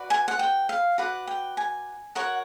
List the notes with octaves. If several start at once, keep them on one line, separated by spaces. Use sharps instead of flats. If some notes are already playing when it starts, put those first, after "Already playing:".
Already playing: F#4 B4 D5
G#5
F#5
G5
F5
F#4 B4 D5 F#5
G5
G#5
F#4 A#4 C#5 F#5